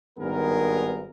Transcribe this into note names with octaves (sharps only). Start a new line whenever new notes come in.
G#1 G2 D#3 B3 G#4 A#4